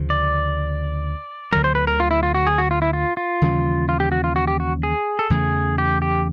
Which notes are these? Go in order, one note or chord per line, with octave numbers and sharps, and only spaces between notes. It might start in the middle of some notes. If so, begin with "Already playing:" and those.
Already playing: D2 C#3 F3
D5
D2 D3 F#3 A#4
C5
B4
A#4
F4
E4
F4
F#4
G#4
F#4
F4
E4
F4
F4
D#2 C#3 E3 G3
F4
G4
F#4
F4
F#4
G4
F#4
G#4
A4
E2 C#3 E3 A3 G#4
G4
G4